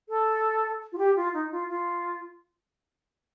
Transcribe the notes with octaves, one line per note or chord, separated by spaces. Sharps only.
A4
F4
G4
F4
D#4
F4
F4